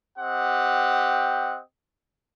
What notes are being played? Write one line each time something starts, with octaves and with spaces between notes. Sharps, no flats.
C4 G4 D#5 F#5